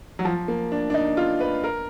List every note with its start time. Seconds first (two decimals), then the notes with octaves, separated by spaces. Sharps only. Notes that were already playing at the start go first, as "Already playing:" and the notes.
0.19 F#3
0.25 F3
0.48 A#3
0.72 D4
0.90 D4
0.94 D#4
1.17 F4
1.40 B4
1.64 A#4